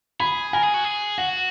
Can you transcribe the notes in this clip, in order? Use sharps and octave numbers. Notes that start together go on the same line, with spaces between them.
G#4 B5
A#4 G#5
G#4
F#4
G#4
F#4 F#5